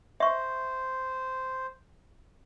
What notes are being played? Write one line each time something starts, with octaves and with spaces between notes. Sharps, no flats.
C5 E5 C#6